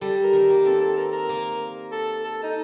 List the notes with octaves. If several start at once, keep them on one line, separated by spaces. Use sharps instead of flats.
G3 A4
A#4
D#3
A#4
A#3
C4 A4
A4
A#4
A#4
A#3
A4
A4
D#4